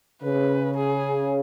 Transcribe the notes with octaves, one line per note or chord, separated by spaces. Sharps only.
C#3 B4
G#4